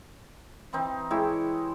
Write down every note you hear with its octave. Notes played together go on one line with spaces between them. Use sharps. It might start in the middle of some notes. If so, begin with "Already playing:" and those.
E3 C4 D#4
G#3 E4 G4 C#5